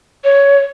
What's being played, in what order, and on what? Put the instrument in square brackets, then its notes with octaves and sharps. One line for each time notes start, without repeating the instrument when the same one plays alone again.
[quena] C#5